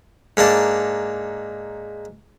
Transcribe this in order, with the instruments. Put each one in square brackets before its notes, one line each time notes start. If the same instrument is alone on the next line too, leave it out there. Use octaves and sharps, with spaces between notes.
[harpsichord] G#2 A#3 D4 A5